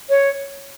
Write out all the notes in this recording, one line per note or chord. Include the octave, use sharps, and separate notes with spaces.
C#5